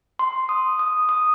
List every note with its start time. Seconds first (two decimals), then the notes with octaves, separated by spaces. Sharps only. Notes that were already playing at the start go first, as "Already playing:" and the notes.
0.19 C6
0.49 D#6
0.79 D#6
1.09 D#6